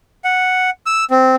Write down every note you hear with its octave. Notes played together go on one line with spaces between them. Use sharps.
F#5
E6
C4